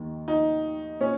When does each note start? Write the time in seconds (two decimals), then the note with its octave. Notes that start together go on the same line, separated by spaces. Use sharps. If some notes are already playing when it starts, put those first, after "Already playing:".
Already playing: D#2 D#3
0.28 D#4
1.00 A#2 C#4